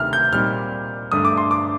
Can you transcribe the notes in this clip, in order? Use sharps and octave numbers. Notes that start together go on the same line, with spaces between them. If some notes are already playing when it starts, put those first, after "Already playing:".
Already playing: D2 C3 D#3 A3 F6
G6
A#2 G3 C4 D#4 F6
G2 D3 A3 D4 D#6
D6
C6
D6